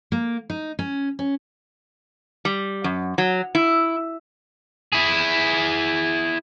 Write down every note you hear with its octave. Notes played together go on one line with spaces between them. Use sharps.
A#3
D#4
C#4
C#4
G3
F#2
F#3
E4
E4 G#4